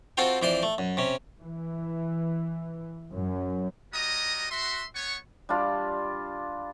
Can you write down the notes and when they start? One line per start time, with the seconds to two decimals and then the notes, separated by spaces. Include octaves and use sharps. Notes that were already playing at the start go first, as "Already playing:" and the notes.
0.17 C4 F4 F#4 A4 C5 G5
0.42 F2 E3 C5 D5 C6
0.63 A3
0.78 F#2
0.97 C3 C#4
1.40 E3
3.12 F#2
3.93 G3 C#4 F#4 D#5 A#5 D#6
4.51 F#4 E5 C6
4.95 B3 C#5 C#6
5.49 G3 D4 F4 D5